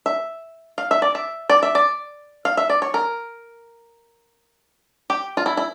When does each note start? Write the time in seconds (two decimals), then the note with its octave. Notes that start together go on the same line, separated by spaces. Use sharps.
0.06 E5
0.78 F5
0.91 E5
1.02 D5
1.15 E5
1.50 D5
1.63 E5
1.75 D5
2.45 F5
2.57 E5
2.70 D5
2.82 C#5
2.94 A#4
5.10 G4
5.37 F4
5.46 E4
5.57 E4